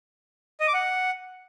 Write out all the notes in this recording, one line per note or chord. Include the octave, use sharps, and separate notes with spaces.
D#5
D6
F#5